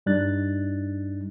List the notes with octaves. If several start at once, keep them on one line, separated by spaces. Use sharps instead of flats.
G2 G3 D4 D#4 F#6 A6